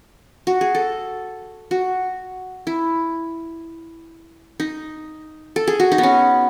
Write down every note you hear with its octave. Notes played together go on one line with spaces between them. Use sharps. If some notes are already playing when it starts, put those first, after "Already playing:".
F#4
G#4
A4
F#4
E4
D#4
A4
G#4
F#4
D#4
B3
C#4